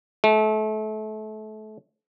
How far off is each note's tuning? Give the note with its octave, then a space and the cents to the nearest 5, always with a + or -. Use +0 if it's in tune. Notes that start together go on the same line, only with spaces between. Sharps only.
A3 -30